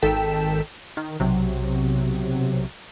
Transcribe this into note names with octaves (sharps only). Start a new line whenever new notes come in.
G#1 D#3 A4 G5 B6 E7
D#3
B1 C3 F#3